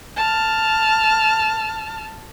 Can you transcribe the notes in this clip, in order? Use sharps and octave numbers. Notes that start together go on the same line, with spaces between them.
A5 F6